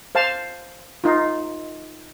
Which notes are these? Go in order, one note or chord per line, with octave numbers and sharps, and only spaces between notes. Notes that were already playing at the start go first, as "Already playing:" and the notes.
C5 F5 A5
D#4 F4